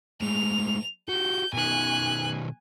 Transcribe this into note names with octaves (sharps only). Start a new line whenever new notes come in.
A2 G#3 F7
F#4 G4 G6
B2 D#3 G#5 F#6